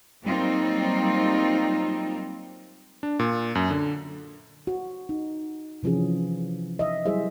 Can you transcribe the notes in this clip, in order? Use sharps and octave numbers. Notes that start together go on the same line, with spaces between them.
F#3 G3 A#3 C4 D#4 F4
D4
A#2
F#2
D3
F#4
D#4
C3 E3 F3 C#4 G#4
D#5 E5
F#3 G3 E4 G#4 C5 E5